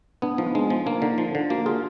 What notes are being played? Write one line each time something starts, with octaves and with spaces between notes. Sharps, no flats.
B3 D4
F3 D#4
B3
G#3 D4
F3
A#3 D4
D3 D#4
F3
D3
A#3 F#4
F4 G#4